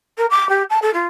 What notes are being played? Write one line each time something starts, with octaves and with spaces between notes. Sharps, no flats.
A#4
D6
G4
A5
A4
F4